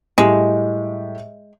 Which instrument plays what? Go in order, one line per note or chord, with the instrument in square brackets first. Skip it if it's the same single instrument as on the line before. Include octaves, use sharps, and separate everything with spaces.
[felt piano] A2 G3 G4 [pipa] G#3